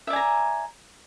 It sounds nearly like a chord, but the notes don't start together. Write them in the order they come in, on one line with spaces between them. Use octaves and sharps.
E5 D5 G#5 A#5